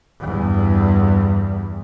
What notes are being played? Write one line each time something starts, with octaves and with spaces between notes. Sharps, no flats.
E2 G2